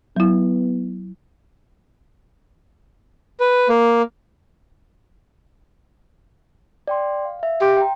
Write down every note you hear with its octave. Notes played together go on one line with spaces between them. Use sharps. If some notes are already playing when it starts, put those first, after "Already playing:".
F#3 B3 E4
B4
A#3
D5 G5 C6
F5
E5 F5
G4 C6
G5 A#5